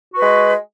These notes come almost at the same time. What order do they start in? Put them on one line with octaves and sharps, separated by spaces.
F#4 B4 G#3